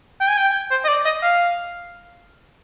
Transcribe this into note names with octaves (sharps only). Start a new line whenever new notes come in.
G5
G#5
G5
C5
D#5
D5
D#5
F5